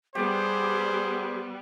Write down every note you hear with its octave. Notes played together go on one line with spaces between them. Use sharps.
G3 B3 G4 G#4 C5